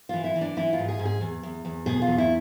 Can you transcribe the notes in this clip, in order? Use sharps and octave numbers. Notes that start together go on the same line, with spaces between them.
E3 F4
E4
E3
D4
E3 E4
F4
G#2
G#4
G#2
G#4
E2
E2
E2
B2 G#4
F4
E2
E4